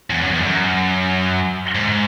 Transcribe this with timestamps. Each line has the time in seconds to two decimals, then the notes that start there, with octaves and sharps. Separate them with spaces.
0.10 E2
0.21 F#2
0.31 E2
0.41 F#2
1.75 G#2